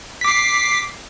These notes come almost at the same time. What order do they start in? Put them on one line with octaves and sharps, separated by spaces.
B6 D6 C7